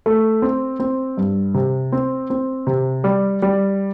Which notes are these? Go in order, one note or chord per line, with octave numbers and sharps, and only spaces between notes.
A3
C4
C4
G2
C3
C4
C4
C3
G3
G3